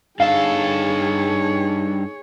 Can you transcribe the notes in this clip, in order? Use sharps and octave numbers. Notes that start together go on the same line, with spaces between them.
G2 D#4 G#4 A4 C#5 F5